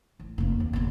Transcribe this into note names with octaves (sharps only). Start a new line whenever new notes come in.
A1
F1 A#3
D#2
F#1 B2